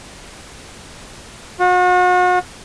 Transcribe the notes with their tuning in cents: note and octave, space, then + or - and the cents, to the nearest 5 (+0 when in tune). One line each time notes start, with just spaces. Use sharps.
F#4 -40